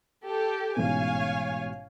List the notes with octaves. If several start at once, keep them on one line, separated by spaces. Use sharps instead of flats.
G4 A4
A1 G#2 B2 C#5 F5 G#5